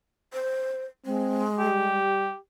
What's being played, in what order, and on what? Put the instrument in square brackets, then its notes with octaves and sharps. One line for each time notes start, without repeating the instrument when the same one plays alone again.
[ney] C5
[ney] G#3 [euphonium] C4
[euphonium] G3 [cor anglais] G4